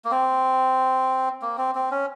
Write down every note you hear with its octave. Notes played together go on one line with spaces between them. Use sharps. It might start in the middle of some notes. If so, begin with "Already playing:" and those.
A#3
C4
A#3
C4
C4
C#4